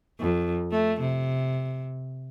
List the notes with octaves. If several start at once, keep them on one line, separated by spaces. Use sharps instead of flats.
F2
A3
C3